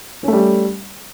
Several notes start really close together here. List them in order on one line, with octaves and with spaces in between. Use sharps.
C#4 A3 G3